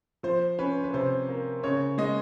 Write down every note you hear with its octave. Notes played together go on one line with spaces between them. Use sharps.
F3 C5
C#4 B4
B4
C3 C5
A#3
C#3 C#5
G#3 D#5